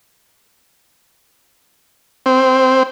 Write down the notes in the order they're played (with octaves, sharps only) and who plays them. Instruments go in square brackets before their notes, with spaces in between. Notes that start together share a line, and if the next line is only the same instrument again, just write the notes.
[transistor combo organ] C4